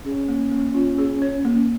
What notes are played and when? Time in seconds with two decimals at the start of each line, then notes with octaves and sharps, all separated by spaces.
0.05 C#4 G#4
0.28 A#3
0.51 A#3
0.74 F4
0.98 G#4
1.22 C#5
1.45 A#3